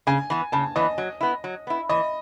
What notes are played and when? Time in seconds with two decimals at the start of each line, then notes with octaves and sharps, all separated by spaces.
0.07 C#3 G#5
0.30 E3 B3
0.52 C#3 A5
0.76 E3 B3 D#5
0.98 F#3
1.21 B3 E4
1.44 F#3
1.67 B3 E4
1.89 E3 D#5